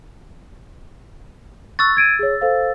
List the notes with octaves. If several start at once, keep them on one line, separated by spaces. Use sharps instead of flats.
C#6 E6 F#6 A6
G#6 D7 D#7
G#4 C#5
A4 C5 F5